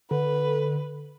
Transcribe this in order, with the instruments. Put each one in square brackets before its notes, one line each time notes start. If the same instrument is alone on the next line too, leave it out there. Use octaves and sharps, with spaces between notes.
[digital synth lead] D3 [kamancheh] B4